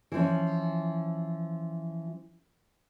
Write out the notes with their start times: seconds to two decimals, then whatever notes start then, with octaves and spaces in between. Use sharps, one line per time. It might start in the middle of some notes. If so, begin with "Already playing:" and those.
0.12 E3 F3 C#4